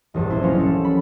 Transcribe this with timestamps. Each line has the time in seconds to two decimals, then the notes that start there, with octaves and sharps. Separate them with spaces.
0.14 E1 A#1 G2
0.30 C4 E4 C5
0.42 F3 F#3 G#3 A#3 C#4 F4
0.59 A4
0.84 B5